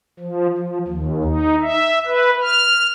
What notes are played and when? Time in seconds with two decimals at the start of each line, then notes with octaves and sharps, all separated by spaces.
0.20 F3
0.58 F3
0.88 D#2
1.24 D#4
1.61 E5
2.06 B4
2.42 F6